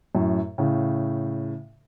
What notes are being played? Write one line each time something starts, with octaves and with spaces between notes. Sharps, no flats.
F#2 A2
A2 C#3